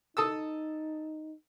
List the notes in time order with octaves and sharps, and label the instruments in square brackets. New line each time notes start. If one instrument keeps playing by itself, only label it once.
[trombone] D#4 [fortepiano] A4 D#6 E6